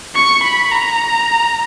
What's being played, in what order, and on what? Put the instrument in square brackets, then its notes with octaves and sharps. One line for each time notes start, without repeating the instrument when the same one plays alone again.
[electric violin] C#6
B5
A#5